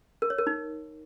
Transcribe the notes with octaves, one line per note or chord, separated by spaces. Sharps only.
A#4
C#5
A#4
D#4